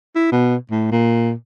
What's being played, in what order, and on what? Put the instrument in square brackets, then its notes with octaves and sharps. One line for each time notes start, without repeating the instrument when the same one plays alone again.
[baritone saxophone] E4
B2
A2
A#2